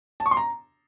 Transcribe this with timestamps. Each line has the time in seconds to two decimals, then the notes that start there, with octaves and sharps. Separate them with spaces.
0.20 A5
0.26 C#6
0.31 C6
0.37 A#5